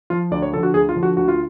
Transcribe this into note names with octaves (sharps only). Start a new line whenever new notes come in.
F3 F4
D2 D5
C#5
D3 F3 A4
F#4
D2 G#4
F4
D3 F3
F#4
D2 F#4
F4